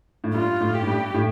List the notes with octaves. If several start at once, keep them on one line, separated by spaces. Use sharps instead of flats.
A2
G2 F4
A2
G4
A2
G2
A2